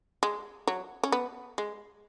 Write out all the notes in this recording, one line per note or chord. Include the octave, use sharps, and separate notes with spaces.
G#3
F#3
C#4
B3
G#3